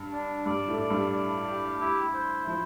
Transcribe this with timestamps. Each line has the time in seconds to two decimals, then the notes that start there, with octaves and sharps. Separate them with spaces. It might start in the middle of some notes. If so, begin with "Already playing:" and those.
Already playing: G2
0.12 D4
0.45 G2 G3 D5
0.67 A2 A3
0.79 D5
0.90 G2 G3
1.12 D5
1.46 G4
1.80 E4
2.14 C5
2.47 F3 E4